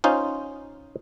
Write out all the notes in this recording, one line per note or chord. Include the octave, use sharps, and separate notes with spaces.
C#4 D#4 F4 C5